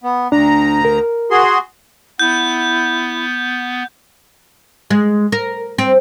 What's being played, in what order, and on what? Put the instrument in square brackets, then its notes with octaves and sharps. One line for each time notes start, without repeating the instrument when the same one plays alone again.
[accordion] B3
[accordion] D2 A#5 [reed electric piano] D4
[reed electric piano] A#4
[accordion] F#4 G#4 C6
[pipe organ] B3 [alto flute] E4 [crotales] G6
[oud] G#3
A#4
C4